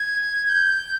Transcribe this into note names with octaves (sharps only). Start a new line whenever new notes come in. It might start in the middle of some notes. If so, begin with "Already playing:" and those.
Already playing: G#6
G6